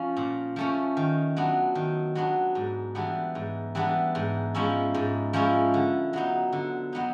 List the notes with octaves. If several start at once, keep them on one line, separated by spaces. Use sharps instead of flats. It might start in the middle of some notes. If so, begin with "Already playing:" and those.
Already playing: F3 C#4
A#2
F3 A3 C#4
D#3
F#3 B3 D4
D#3
F#3 B3 D4
G#2
E3 G3 B3 D4
G#2
E3 G3 B3 D4
G#2
F3 G#3 C#4 E4
G#2
F3 G#3 C#4 E4
D3
F#3 B3 D#4
D3
F#3 B3 D#4